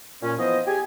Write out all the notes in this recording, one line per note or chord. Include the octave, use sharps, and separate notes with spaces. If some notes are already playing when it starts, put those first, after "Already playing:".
A#2 C#4
E3 F3 B3 C5 D#5
G4 G#4 G#5